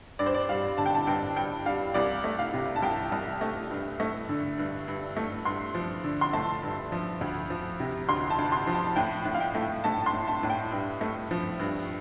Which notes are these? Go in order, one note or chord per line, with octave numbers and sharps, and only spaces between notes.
G2 D5
C5
D5
G3 F5
D3 A5
G5
A5
G2 G5
G2 G5
G3 F5
C2 D5
A3
F5
C3
A5
C2 G5
C2
A3
G2
A3
D3
G2
G2
A3
G2 C6
F3
D3
C6
A3 A5
G2
F3
D2
F3
C3
D2 C6
A5
D2
C6
F3
A5
A2 G5
A2
F5
G5
A3
A3 A5
C6
A2
A5
A2
G5
G2
A3
F3
G2